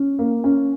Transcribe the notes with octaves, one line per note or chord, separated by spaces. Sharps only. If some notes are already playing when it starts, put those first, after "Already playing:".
Already playing: C#4
A#3
C#4